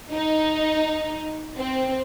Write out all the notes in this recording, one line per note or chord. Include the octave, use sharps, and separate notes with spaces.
D#4
C4